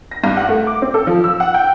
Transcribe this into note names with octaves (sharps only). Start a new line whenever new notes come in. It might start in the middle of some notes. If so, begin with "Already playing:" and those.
A#6
G2
F#5
A3
D6
C4
A4
F3
E6
F#5
G5